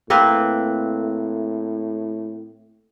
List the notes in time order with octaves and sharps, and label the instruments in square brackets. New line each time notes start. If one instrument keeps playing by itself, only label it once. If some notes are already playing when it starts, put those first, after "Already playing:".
[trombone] A2 [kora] A#3 C4 B4